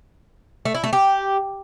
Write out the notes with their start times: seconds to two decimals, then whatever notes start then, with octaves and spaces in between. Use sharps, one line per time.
0.65 A3
0.75 E4
0.84 A3
0.93 G4